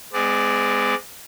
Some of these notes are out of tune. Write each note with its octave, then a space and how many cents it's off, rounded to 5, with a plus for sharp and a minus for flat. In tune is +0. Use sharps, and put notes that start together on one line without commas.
G#3 +0 C4 -45 D5 +5